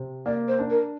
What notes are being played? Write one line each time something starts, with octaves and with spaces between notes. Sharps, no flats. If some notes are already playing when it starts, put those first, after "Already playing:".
Already playing: C3
A#3 D5
C5
D4
A#4